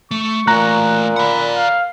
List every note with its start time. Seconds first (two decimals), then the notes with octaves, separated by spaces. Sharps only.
0.11 A3 C#6
0.47 A#2 E3 A3 A#5 F#6
1.16 D5 F#5 B5
1.55 F5